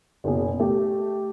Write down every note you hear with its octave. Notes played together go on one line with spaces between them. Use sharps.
F#1 B2 G#4
A3 G4